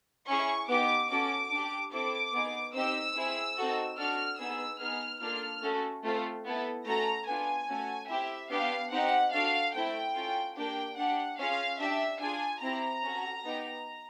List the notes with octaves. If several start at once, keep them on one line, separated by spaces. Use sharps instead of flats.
C#4 E4 G#4 C#6
B3 D#4 G4 D6
C#4 F#4 A4 D6
D4
G4
C4 E4 A4 D6
B3 D#4 G#4
C4 D#4 G4 E6
C4 E4 G#4
C4 D#4 F#4 A4
D4 F#4 A4 F6
B3 D#4 G#4 E6
B3 D#4 G#4 F6
A#3 D4 F4 A4 F6
A3 C#4 F#4 A4
A3 C4 F4 A4
B3 E4 A4
A3 C#4 F#4 A4 A#5
B3 D4 F4 G#5
A3 C#4 F#4 A4
C4 E4 G4 E5
B3 D4 G4 F5
C4 D#4 G4 F#5
D4 F#4 A4 F5
A3 C4 E4 G5
C#4 F4 A4
A#3 D4 G4 G5
D4 G4 F#5
C#4 F4 G#4 F5
D4 G4 E5
D4 F4 G#4 G#5
C4 E4 G4 A#5
C#4 F#4 A4
B3 D#4 G4